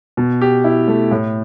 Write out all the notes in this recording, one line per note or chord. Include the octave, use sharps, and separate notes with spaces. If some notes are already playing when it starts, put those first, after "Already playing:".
B2
G4
E4
A3
A2